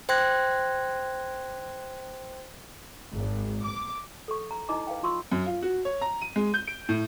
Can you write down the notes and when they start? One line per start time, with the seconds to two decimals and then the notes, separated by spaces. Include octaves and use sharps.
0.09 C5 G5 C6 F#6 G#6 A#6
3.12 G#1
3.65 D6
4.28 A4 C#6
4.51 A#5
4.69 D#4 E4 D#5 A#5 D6
4.87 B4 F5 G5
5.03 F4 C6 C#6 E6
5.32 F#2
5.46 F4
5.62 F#4
5.85 C#5
6.01 A#5
6.22 D#7
6.36 G#3
6.54 G6
6.67 D7
6.89 A2